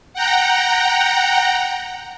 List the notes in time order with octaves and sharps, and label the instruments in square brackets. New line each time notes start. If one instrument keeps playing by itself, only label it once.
[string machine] F#5 G5 A#5